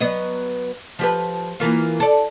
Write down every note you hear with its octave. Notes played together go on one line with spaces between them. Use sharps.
F#3 B3 D#5
F3 G4 B4
E3 A#3 F4
A4 D5